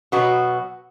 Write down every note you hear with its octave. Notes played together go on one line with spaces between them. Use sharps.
B2 F#3 B3 F#4